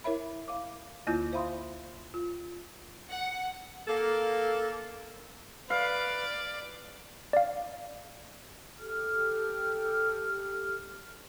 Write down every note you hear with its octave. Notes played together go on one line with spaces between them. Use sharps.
E4 A#4 C#5 E5 B5
F5 D6
D2 D3 A#3 E4 F4 G6
C5 E5 F5 B5 C6 D#6
F4
F#5
A#3 A4
B4 D5 F5
D5 F5
G4 A4 F6